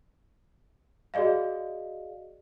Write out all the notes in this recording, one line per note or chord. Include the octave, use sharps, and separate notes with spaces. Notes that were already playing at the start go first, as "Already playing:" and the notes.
F#4 G#4 D5 D#5 F5